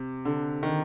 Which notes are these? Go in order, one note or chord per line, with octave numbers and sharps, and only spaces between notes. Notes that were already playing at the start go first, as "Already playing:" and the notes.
Already playing: C3
D3
D#3